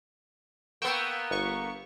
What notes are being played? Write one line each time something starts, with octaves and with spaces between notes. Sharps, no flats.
A#3 B3 G5 C#6 E6
G1 C#6